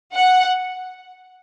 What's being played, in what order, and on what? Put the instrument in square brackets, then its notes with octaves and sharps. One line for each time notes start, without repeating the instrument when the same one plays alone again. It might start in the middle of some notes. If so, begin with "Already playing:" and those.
[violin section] F#5